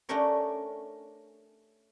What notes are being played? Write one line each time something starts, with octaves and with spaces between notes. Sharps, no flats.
A3 C#4 D4 G4 A#4 C#5